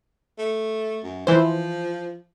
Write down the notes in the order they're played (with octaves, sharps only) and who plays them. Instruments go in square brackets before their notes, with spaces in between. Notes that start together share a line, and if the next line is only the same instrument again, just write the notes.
[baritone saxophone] A3
F#2
[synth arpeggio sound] E3 C5 [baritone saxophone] F3